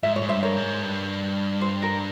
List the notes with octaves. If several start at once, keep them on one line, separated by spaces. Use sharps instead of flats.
G#2 E5
C#5
G#2
G2 C5 E5
A#4 C#5
G#2
G2
C5
A#4